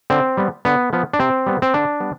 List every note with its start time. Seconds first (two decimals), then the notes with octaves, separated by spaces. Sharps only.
0.10 D3 C4
0.37 G3 B3
0.65 D3 B3
0.93 F3 B3
1.13 D4
1.19 C3 C4
1.46 G3 B3
1.62 C4
1.74 D3 D4
2.00 G3 B3